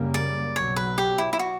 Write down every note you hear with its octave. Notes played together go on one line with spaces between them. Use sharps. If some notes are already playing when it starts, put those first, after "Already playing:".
Already playing: F#2 C#3 G3 A#3
D5
B1 B2 F#3 C#5
B4
G4
E4
E4
F#4